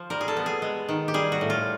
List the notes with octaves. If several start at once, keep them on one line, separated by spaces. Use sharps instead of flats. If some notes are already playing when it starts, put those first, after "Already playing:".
Already playing: F3 C5
G3 A#4
G#4
A4
B3
G#4
G#3
D#3
G4
G3 G#4
F#4
A2
F4